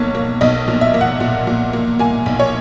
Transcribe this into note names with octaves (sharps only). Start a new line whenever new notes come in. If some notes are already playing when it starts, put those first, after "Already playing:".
Already playing: B1 A#3 C#5
A#3
B1 D#5
A#2
E5
A#3
F#5
A#2
A#2
A#3
A#3 G#5
B1
C#5